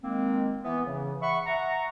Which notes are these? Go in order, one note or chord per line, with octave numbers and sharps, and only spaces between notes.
D#3 G#3 A#3 C4
E3 B3
C#3 E3
E5 F#5 B5 C#6
E5 F#5 A#5 C#6